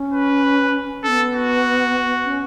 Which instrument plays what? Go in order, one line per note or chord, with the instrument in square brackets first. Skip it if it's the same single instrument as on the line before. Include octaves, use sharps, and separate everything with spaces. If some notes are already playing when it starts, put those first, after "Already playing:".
Already playing: [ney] C#4
[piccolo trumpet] B4
[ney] B3 C#4 [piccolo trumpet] A4
[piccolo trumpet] F#4
[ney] C#4